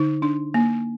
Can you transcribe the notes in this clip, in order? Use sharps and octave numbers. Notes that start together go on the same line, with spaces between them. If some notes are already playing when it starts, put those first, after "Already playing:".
Already playing: D3 D#4
D4
A#3